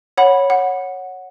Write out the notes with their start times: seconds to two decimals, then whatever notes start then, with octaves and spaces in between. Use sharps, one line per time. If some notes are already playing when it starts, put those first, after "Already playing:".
0.17 C#5 F#5 B5
0.50 F#5